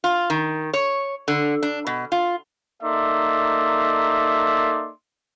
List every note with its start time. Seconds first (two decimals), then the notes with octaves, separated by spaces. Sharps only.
0.04 F4
0.30 D#3
0.73 C#5
1.28 D3
1.63 D4
1.87 B2
2.12 F4
2.83 A#3 D#4 A4 D5 E5 C6